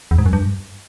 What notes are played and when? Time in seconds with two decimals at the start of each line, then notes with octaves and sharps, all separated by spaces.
0.11 E2
0.18 G#2
0.26 F#2
0.33 G2